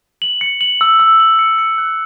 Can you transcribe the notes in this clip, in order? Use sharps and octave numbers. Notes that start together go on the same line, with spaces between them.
F#7
C#7
F#7
E6
E6
F#7
C#7
C#7
F#6